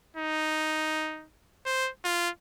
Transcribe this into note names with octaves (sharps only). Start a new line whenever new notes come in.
D#4
C5
F4